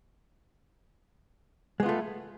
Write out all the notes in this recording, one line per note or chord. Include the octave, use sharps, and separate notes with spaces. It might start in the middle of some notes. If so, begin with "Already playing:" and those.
G#3 A3 B3 F4